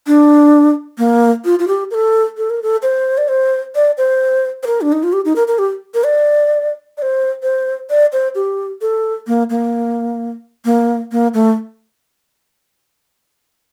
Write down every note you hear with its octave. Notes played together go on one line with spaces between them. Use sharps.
D4
A#3
F4
F4
G4
A#4
A4
A4
A#4
A4
C5
D5
C5
D5
C5
C5
A#4
D4
D#4
F4
G4
D#4
A#4
A#4
G4
A#4
D5
D5
C5
C5
D5
C5
G4
A4
A#3
A#3
A#3
A#3
A3